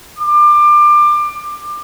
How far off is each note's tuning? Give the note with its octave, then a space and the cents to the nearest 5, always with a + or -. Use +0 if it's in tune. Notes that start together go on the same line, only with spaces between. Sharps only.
D6 +25